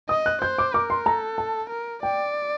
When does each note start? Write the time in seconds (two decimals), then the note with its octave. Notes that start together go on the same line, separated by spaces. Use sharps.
0.09 D#5 D#6
0.26 F#6
0.42 C5 G6
0.58 D6
0.74 A#4 D6
0.90 C6
1.06 A4 A#5
1.38 A5
1.70 A#4
2.03 D5 G5